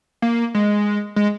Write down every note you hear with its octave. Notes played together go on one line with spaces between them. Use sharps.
A#3
G#3
G#3